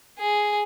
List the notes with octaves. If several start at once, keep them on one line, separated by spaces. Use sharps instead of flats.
G#4